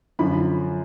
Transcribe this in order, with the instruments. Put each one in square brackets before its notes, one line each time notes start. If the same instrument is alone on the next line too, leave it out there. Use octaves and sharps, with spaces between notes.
[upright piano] F#2 D3 F3 B5